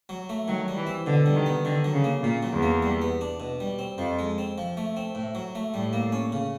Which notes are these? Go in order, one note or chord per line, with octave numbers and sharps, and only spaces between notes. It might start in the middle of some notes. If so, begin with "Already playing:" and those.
F#3
A3
D#3 F#3
G3
E3
C4
B2 D3
G3
D#3
B3
D3 D#3
F#3
C#3
A#3
A#2 C#3
F#3
E2
A#3
G3
B3
D4
B2
G3
C4
F2 F3
G#3
C4
F3
A3
C4
A2
F#3
A3
A2 G3
A#3
C#4
C#3